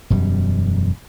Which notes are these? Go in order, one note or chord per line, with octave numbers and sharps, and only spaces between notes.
E1 F#2 G3